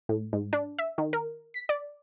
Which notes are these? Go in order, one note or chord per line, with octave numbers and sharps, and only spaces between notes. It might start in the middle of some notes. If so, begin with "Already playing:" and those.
A2
G#2
D4
E5
D#3
A#4
B6
D5